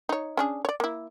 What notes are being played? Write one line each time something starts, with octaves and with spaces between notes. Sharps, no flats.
D#4 C#5
C#4 D4 G#4
C#5 D5
A#3 E4